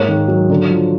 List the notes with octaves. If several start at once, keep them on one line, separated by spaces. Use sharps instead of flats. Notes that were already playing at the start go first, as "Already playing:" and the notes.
Already playing: G#2 A#3 C#5
D#3
F#3
D3
F3